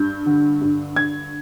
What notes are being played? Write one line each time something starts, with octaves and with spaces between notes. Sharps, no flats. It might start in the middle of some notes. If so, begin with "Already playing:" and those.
Already playing: G2 G6
D3
G2
D3 G#6